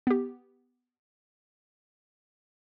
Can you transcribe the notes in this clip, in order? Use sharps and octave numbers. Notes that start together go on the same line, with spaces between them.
B3 G4